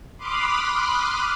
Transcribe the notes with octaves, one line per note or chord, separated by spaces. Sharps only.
B5 C6 D6 D#6 F6 F#6